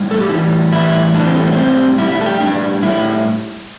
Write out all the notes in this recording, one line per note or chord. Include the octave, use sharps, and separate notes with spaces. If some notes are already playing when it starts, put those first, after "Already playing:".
Already playing: A2 G3
A4
G4
A2 E3 G3 E4
A2 E3 G3 E4
A2 E3 G3 D4
C4
A3
C4
A3
A2 G3 C4
A2 G3 E4
E4
A4
G4
A2 G3 D4
A2 G3 E4